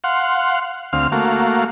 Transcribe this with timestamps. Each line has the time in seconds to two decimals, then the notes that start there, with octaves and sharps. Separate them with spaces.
0.04 F5 F#5 C6
0.93 D2 C4 F5 F6
1.12 A3 A#3 F#4 F5